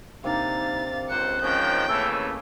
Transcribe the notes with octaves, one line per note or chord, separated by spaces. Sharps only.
C3 A#3 D4 D#4 F5 A6
C#2 C5 A#5 F#6 C#7
G#2 D#3 F3 C#4 D#5 G5 G6
C#3 E3 A3 A#3 A5 E6